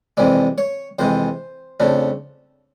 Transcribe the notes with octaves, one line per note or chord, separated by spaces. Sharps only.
F2 C3 E3 G#3 D5
C#5
F2 C3 E3 G#3 C5
F2 C#3 F3 A3 D4